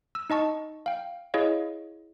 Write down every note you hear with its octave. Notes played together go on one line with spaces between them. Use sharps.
E6
D#4 D#5 A5 C#6
F5 G5
E4 G#4 C#5 D#5 F5